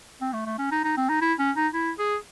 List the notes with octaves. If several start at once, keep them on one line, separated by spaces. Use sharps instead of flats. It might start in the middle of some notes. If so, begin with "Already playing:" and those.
C4
A3
A3
C#4
D#4
D#4
C4
D#4
E4
C#4
D#4
E4
G#4